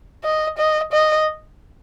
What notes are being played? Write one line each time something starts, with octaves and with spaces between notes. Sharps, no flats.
D#5
D#5
D#5